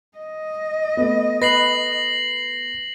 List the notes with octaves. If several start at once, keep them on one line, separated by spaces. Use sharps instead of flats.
D#5
A3 B3
B4 A#6 C7 F#7